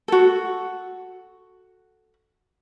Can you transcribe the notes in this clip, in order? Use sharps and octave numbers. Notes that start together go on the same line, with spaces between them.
F#4 A4